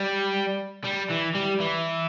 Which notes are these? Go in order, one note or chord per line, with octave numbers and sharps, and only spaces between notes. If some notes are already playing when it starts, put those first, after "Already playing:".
Already playing: G3
G3
E3
G3
E3